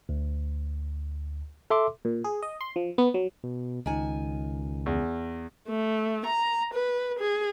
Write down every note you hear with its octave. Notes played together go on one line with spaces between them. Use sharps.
D2
A4 E5 C6 D6
A#2
G#4
D#5
C6
F3
B3
F#3
B2
C#2 D#3 G#5
E2
A3
A#5
B4
G#4